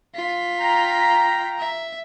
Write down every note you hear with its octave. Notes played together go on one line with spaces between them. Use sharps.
F4 B6
F5 G5 A#5
E5